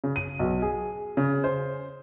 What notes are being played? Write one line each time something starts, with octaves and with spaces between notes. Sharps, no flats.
C#3
D#7
B1
G#4
C#3
C5